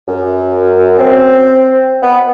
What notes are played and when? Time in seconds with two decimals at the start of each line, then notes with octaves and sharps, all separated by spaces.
0.08 F#2
0.99 C4
2.02 B3